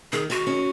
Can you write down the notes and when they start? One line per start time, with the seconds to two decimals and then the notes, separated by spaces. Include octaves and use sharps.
0.12 D#3 G#4
0.30 D#3 F#4
0.47 C#4